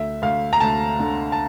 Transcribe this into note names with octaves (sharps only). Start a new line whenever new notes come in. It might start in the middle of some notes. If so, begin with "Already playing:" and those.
Already playing: D2 E5
D2 F5
A#5
D2 A5
D3
A5